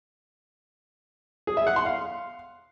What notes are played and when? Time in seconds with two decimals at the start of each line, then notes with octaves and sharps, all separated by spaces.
1.47 G#4
1.57 E5
1.67 F#5
1.76 C6
1.86 F5